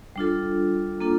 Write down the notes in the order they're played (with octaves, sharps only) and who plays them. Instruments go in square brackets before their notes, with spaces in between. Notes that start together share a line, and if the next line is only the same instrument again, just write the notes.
[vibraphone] G3 D4 F4 A4
A#3 D4 F4 A4